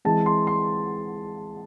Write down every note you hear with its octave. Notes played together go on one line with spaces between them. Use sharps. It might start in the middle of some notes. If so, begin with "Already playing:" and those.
E3 G#3 C4 A5
C6
C6